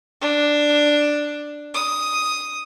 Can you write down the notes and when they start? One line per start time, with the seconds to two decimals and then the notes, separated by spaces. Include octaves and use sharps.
0.21 D4
1.74 D#6